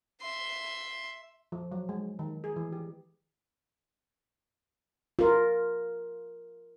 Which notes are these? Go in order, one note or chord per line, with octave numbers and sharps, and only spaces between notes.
E5 C6
F3
F#3
G#3
D#3
G#4
E3
G4
F4 A#4